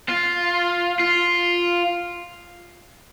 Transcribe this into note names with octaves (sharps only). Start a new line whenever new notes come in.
F4
F4